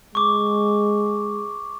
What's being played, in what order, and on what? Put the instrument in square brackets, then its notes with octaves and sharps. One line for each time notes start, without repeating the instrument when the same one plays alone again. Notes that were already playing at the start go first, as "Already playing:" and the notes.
[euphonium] G#3 [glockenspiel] C#6 D6